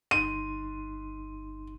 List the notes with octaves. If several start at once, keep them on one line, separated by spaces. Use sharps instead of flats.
G1 D#4 C6 D#7